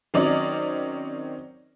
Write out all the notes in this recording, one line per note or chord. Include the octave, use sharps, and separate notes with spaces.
D#3 F#3 C4 C#4 D5 D#5